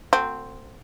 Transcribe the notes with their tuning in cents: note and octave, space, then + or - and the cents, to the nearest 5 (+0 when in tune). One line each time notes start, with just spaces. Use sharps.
A3 +45 C4 +0 F#4 -20